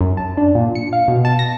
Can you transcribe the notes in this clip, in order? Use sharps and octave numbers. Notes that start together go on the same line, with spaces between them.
F#2
A5
D4
A#2
C#7
F5
B2
A5
A#6